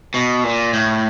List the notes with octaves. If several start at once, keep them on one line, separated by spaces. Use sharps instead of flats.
B2
A#2
A2